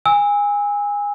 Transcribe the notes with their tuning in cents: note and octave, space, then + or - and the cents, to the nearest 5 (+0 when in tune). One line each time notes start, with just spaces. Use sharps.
G#5 -20 E6 -25